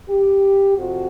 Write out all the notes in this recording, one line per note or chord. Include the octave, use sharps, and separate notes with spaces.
G4
F2 C3 F3 F#4